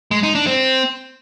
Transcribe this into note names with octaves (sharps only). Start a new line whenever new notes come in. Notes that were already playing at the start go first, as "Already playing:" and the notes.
G#3
D#4
D4
C4